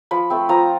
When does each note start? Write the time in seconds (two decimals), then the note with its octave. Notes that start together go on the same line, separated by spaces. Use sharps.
0.11 F3 B5
0.30 A3 C4
0.49 F3 A#5